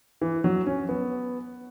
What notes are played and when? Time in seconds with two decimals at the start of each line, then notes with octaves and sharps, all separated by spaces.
0.21 E3
0.44 F#3
0.66 C#4
0.89 B3